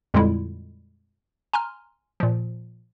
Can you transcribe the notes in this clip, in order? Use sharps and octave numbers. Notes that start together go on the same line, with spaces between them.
F2 A#2 D3 G3 G#3 E4
G#5 A#5 C6 F6
A#2 F3